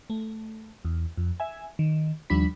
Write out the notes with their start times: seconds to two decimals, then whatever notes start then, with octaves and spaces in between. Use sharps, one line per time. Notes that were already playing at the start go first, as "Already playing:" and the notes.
0.10 A3
0.85 E2
1.18 F2
1.40 E5 G#5
1.79 D#3
2.30 D#2 F3 G3 D4 B5 B6